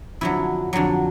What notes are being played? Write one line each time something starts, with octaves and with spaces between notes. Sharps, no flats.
F2 D3 F#3 E4
F2 D3 F#3